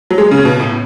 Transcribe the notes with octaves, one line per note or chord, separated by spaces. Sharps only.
F#3
G#3
C#3
B2
A2